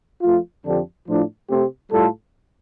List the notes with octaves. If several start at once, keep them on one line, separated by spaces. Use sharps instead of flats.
F2 F3 A3 F4
F2 D3 F3 D4 G4
A2 F3 D4 F4
C3 A3 C4 G4
A2 G3 F4 A4